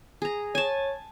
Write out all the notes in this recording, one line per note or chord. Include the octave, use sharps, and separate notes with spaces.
G#4 A#5
C#5 G#5 A5